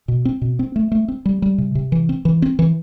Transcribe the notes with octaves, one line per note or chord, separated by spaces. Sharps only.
B2
C4
B2
C4
A3
A3
C4
G3
G3
C3
C3
E3
C4
E3
C4
E3